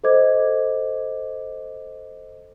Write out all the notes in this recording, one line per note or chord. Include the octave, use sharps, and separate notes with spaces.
A4 C5 D#5 D6 G#6